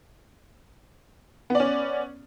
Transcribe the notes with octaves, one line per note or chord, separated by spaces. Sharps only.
B3 C#4 D5